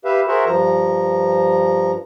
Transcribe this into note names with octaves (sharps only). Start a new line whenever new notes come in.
G4 B4 E5 F5
F#4 G#4 A#4 C5 E5 F#5
G2 F3 A#5